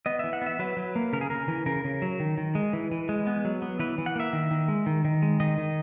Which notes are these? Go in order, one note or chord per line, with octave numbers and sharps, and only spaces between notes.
B3 D#5
E3 E5
F#5
B3 E5
F#3 B4
F#3
A#3
C#3 A#4
G#4
C#3 A#4
E3
C#3 A#4
C#3
F#3
D#3
D#3
G#3
E3
E3
G#3
B3
F#3
B3
E3 B4
E3
F#5
A#3 E5
D#3
D#3
G#3
D#3
D#3
G#3
D#3 D#5
D#3